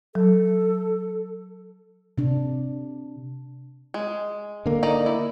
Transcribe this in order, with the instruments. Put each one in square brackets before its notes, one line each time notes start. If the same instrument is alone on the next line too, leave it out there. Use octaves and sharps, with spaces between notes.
[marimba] F#3 [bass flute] A4
[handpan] C3 D4
[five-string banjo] G#3
[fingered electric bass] D3 A#3
[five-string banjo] D#4 D5 A#5
E4